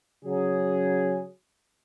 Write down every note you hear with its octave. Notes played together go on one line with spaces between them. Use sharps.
C#3 F#3 G#4